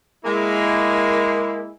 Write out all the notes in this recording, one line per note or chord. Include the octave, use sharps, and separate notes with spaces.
G#3 A#3 E4